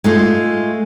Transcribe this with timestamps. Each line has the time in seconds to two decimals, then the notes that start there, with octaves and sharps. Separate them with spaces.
0.04 G#3 A3 F4